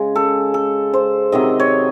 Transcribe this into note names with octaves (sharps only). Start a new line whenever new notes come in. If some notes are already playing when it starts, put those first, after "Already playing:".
Already playing: C#3 G#3
A4
A4
C5
C3 D#3 F#3 D#5
C#5